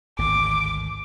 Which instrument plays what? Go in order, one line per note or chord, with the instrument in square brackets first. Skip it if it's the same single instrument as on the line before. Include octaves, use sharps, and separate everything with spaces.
[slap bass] G#1 D2 A2 [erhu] D6